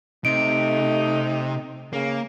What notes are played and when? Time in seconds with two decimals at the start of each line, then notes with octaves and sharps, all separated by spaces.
0.25 C3 A3 D#4 D7
1.93 C#3 A#3